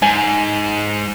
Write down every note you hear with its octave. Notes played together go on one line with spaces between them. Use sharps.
G#2 G#5